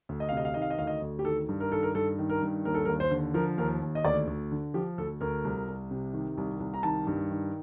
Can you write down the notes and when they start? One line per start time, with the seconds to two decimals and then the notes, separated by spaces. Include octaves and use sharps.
0.09 D2
0.20 D#5
0.29 F5
0.32 C3 D#5
0.45 F5
0.54 D#3 D#5
0.62 F5
0.70 D#5
0.78 D2 F5
0.87 D#5
1.02 D2
1.19 G4
1.25 D#3 A4
1.49 G2
1.60 A#4
1.72 D#3 A4
1.83 A#4
1.95 G2 A4
2.19 D#3
2.30 A#4
2.42 G2
2.65 D#2 A#4
2.75 A4
2.85 D#2 A#4
3.00 C5
3.11 D3
3.34 F3 A#4
3.58 D#2 A#4
3.81 D#2
3.95 D#5
4.04 D2 D5
4.27 D2
4.51 D3
4.74 F3 G4
4.98 D2 A4
5.21 D2 A#4
5.45 C2
5.68 C2
5.91 C3
6.13 D#3
6.37 C2
6.60 C2
6.74 A#5
6.83 D#3 A5
7.07 G2
7.30 D#3